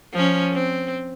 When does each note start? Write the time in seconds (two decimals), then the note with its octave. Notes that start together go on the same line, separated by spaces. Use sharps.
0.13 F3 C#4
0.53 C4